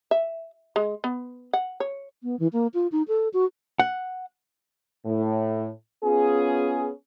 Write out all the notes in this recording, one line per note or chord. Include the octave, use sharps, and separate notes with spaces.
E5
G#3
B3
F#5
C#5
B3
E3
A#3
F4
D#4
A4
F#4
F#5
A2
B3 C#4 F4 G#4